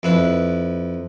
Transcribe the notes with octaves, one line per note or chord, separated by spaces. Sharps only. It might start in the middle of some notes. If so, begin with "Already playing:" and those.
F2 E4 B4